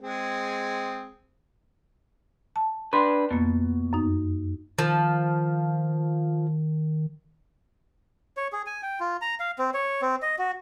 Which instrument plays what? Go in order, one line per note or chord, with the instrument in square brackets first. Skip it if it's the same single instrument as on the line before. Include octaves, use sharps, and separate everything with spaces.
[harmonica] G#3 C4 G#4
[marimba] A5
[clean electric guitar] D4 B4 [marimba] C6
[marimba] F2 A#3 [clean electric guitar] B2
[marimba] F#2 D#4
[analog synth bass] D#3 [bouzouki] F3
[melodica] C#5
G#4
G#5
G5
F4
A#5
F5
C4
C#5
C4
D#5
F#4